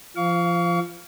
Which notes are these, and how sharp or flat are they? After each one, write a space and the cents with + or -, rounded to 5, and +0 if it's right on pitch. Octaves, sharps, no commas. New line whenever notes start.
F3 -25 F5 +0 C#6 +40